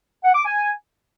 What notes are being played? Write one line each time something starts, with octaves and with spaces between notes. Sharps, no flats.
F#5
D6
G#5